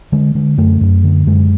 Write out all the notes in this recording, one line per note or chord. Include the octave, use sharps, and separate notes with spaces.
D3 G#3
D3 G#3
F#2 A3
F#2
D3
F#2 G#3